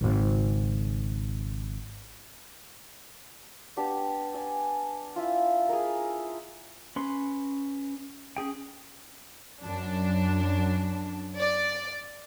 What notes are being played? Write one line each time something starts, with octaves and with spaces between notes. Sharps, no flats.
G#1 C#3
B3 D4 G4
D5 G#5
E4 F4
G#4 A#4
C#4 B4 C6
C#4 G#4 G5
F#2 D4
D5